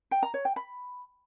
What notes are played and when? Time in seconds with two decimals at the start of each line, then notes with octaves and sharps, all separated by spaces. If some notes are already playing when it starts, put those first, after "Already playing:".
0.11 G5
0.23 A#5
0.34 C#5
0.45 G5
0.56 B5